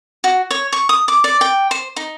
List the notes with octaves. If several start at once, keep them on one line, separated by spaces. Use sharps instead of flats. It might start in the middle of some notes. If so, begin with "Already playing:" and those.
F#4
C#5
C#6
D#6
D6
D5
G5
C5
D#4